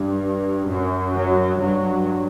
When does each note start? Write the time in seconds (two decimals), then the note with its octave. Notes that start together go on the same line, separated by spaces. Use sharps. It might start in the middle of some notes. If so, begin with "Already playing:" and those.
Already playing: G2
0.69 F#2
1.14 F#3
1.60 G2 F#3